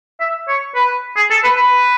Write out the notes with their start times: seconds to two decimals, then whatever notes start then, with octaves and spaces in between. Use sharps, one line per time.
0.20 E5
0.48 C#5
0.75 B4
1.17 G#4
1.31 A4
1.44 B4
1.57 B4